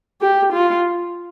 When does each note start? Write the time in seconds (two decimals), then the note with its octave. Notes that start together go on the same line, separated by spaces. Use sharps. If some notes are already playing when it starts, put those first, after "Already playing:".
0.21 G4
0.52 F4